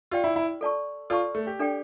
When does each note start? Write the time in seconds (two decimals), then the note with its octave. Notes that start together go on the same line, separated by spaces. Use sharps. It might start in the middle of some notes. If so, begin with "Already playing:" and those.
0.11 F4 G4 D5 G5
0.24 E4
0.36 E4
0.61 A4 D5 A5 C#6
1.10 F4 A4 D5 A5 C#6
1.35 A3
1.47 G4
1.59 D4 A4 D5 G5